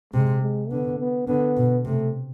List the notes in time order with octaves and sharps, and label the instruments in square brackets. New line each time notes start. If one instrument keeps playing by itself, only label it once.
[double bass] C3 [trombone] G#3
[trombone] G#3
[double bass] D3 [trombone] B3
[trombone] B3
[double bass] D3 [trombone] B3
[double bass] B2
[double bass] C3 [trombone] A3